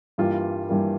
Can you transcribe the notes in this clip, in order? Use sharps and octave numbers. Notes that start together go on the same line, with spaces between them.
G2 E3 G3 A#3 F4
G2 E3 G3 A#3